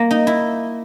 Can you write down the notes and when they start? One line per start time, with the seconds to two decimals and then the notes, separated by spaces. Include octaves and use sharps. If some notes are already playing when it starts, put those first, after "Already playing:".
Already playing: A#3
0.11 D#4
0.27 E4